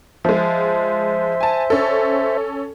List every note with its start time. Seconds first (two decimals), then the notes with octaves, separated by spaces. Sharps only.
0.25 F3 G#3 C5 E5
1.41 G#5 A5
1.70 C#4 A4